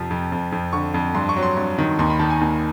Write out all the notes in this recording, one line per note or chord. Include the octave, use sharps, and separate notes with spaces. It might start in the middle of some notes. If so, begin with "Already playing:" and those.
Already playing: F2 C3 F3
F2
F2
F2
D3 C#6
F2
G2 C6
C#6
F#3
C6
G2
D#3
D#2 C6
B5
D#3 A5
G#5
D#2